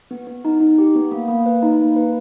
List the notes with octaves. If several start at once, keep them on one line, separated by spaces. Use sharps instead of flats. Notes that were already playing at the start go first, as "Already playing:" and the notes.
B3
B3
D#4
D#4
G4
B3
A#3
A#3
B4
D#4
A#3
B4